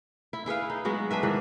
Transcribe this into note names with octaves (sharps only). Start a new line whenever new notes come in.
E4
E4 G#4 B4 F5
D#4
F#3 G#3 B3 F#4
D4 G#4 B4 E5
G#2 D#3 E3